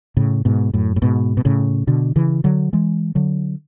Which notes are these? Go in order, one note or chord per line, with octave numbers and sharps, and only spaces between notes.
A2 C#3
G#2 B2
F#2 A2
A2
G#2 B2
B2
A2 C#3
B2 D3
C#3 E3
D3 F#3
E3 G#3
D3 F#3